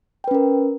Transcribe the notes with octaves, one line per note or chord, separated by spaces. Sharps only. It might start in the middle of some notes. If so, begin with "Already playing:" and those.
C#4 A#4 B4 G5